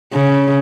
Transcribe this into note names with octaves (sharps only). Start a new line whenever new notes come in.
C#3